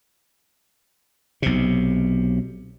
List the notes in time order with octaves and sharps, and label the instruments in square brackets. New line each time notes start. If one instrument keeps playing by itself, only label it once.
[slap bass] B1 C3